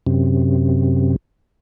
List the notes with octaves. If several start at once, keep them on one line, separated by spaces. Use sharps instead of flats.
F#2 C3